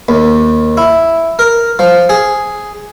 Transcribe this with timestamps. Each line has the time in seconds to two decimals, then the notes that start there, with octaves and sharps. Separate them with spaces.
0.09 D#2
0.77 E4
1.39 A#4
1.79 F3
2.09 G#4